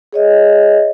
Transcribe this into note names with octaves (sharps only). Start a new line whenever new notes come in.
G#4 C#5 D#5 E5